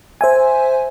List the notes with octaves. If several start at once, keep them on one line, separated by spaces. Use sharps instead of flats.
C5 E5 G#5